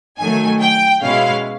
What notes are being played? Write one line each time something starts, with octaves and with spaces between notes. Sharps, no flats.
D#3 F#3 A3 G#5
G5
B2 G#3 C#4 E4 F5